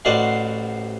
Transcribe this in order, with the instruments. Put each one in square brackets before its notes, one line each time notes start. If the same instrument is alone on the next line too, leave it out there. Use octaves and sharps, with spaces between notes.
[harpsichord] A1 F#4 C5 D5 D#5 F5